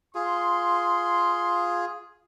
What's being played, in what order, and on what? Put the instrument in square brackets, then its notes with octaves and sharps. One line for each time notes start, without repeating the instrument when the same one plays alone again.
[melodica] F4 G#4 [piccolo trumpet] C6